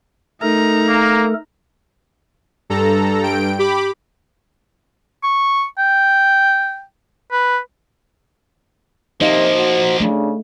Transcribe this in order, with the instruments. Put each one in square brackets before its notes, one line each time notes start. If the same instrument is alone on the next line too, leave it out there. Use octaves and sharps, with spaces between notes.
[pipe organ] A3 A4 A#4 [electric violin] D#4 A#5
[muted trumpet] A#3
[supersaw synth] G2 A4 A#5
G2 G5 D7
G4 B5 D6
[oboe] C#6
G5
B4
[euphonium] C3 [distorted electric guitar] F3 A#3 [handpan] D#4 D#5 F5 [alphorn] C5
[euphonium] F#4
[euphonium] C#3 [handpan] A3 [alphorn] D4